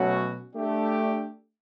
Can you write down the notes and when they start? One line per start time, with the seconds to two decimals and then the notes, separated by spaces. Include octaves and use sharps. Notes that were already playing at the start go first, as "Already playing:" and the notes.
Already playing: B2 F#3 A3 C#4 F#4
0.55 A3 D4 G4